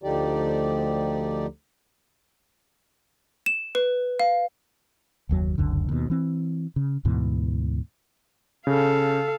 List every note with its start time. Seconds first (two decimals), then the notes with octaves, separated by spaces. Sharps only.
0.03 D2 D3 F3 D#4 G4 D5
3.46 E7
3.75 B4
4.19 F5
5.29 F#1 D#2 F#3
5.58 F1 C#2 F#2 D3
5.89 D#2 B2
6.10 E3 C4
6.76 C#3
7.05 D2 G#2 B2 E3
8.67 C#3 A4 F5